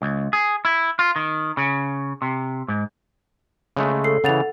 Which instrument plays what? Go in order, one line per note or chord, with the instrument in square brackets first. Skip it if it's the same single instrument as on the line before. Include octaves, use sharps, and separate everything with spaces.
[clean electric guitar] C#2
G#4
E4
F4
D#3
C#3
C3
G#2
[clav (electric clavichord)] C#3 G#3 A3
[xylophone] A4 C7
[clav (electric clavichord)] C#3 E3 [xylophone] F#5 A6 F7